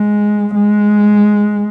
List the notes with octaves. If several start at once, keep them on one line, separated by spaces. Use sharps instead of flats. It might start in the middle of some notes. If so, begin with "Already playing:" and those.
Already playing: G#3
G#3